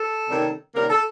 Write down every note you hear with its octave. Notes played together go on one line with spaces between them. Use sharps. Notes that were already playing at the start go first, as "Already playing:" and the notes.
Already playing: A4
C3 D#3 G3 A#3 C#4
C3 D#3 G3 A#3 C#4 A#4
A4